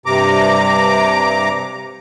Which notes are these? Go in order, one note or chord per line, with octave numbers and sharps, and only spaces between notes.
G2 C3 A#5 D6